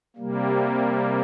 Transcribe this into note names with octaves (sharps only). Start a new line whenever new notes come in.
C3 G3 A#3